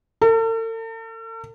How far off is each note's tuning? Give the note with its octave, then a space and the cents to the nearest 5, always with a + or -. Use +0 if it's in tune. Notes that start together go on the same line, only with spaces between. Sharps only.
A4 +45